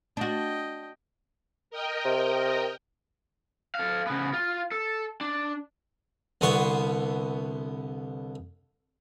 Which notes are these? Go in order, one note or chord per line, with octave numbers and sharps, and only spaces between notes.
D4 F#4 D#5 G5
A#4 D#5 G5
C3
A4 F5
C#3 B3
F4
A4
D4
C2 D3 B3 C6 C#6